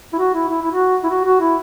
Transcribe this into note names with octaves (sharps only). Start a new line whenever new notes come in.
E4
F#4
E4
E4
E4
F#4
E4
F#4
F#4
E4